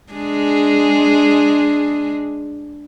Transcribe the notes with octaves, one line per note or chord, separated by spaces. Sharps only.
G#3 D4 G#4